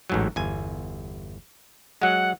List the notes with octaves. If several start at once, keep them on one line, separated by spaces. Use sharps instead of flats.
A1 G#2 F#3
G1 E2 G#5
F#3 G#3 F#5